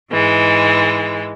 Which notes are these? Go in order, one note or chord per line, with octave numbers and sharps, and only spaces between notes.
G#2 E3 G#3